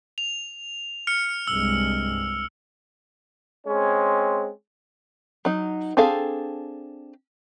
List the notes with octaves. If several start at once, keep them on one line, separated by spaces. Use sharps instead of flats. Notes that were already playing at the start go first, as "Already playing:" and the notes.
F7
F6 C#7
C2 G2 G#3 E6
G#3 C4 C#4
F#3 D#4
C4 D4 G#4 A4 F5